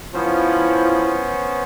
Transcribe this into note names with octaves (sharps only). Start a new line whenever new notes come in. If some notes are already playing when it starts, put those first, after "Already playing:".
F3 B3 C#4 E4 C5